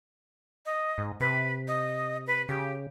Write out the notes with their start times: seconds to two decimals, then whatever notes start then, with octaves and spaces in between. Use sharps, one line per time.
0.66 D#5
0.98 G#2
1.20 C3 B4
1.68 D#5
2.27 B4
2.49 C#3 G4